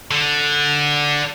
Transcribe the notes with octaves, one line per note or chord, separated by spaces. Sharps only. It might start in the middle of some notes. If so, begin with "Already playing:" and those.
D3